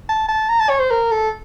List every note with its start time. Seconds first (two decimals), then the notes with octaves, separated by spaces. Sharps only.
0.09 A5
0.28 A5
0.49 A#5
0.59 A5
0.69 C#5
0.80 C5
0.90 A#4
1.11 A4